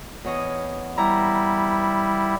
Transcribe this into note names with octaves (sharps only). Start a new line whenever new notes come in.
E2 C#5 D#5
G3 E4 A#5